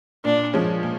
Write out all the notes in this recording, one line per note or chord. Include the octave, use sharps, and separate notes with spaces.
A#2 D4
F3 G#3 C#4
A#2